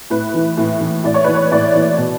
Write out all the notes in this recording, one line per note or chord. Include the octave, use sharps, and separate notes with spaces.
A2 B4
E3
A2
E3
A2 D5
C#5
E3 B4
C#5
A2 D5
E3
B2